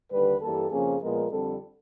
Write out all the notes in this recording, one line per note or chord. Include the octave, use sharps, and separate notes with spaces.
D#2 D3 G3 B4
G2 E3 G3 A#3 A4
F2 C#3 F3 A#3 C#4 G#4
A#2 F3 G#3 B3 A#4
F2 D3 G3 C4 A4